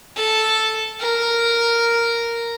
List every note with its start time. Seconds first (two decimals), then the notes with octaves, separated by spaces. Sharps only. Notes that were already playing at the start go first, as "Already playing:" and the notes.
0.16 A4
1.00 A#4